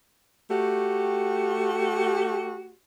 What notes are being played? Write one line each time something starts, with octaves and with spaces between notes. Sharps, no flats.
A3 F#4 G4